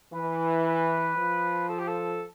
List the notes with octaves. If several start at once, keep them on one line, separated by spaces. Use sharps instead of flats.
E3 B4
B4
F3
A4
G4
A4